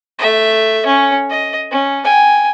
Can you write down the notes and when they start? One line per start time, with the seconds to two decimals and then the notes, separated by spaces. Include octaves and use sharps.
0.18 A3 E5
0.86 C#4 C#5
1.30 D#5
1.71 C#4
2.04 G5 G#5